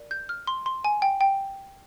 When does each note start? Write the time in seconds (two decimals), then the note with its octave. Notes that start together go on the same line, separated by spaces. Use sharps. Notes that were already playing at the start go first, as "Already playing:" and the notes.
Already playing: A#4 D5
0.11 G6
0.29 F6
0.47 C6
0.66 C6
0.84 G#5
1.02 G5
1.21 G5